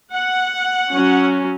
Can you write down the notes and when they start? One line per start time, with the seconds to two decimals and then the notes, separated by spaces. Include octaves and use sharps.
0.13 F#5
0.91 F#3 C#4